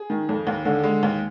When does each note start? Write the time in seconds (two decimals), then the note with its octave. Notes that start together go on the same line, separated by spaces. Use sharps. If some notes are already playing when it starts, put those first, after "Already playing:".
Already playing: G#4
0.10 D#3
0.29 F2
0.47 D#2
0.65 D3
0.84 G#3
1.03 D#2